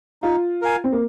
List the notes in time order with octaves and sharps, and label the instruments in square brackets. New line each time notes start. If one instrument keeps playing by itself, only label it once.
[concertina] D#4 [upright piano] F4
[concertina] A#4 F5 G#5
[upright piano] C4
A#3